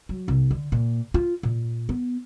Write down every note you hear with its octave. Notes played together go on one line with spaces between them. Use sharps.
F#3
C2
D3
A#2
F4
A#2
B3